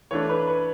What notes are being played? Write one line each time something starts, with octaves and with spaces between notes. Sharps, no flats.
E3 A3 D4 C#5
B4
B4